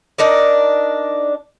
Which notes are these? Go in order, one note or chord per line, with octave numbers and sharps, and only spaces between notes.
D4 D#4 A#4 D5